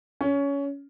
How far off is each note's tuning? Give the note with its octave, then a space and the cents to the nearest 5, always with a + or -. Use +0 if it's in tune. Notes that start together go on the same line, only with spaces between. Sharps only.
C#4 +20